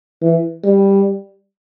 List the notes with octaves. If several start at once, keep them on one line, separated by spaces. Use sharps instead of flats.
E3
G3